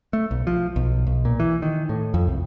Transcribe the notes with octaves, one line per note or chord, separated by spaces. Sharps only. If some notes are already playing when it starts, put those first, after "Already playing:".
A3
B1
F3
B1
B1
A#2
E3
D#3
A2
F2
C2